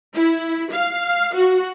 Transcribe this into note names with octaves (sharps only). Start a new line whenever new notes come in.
E4
F5
F#4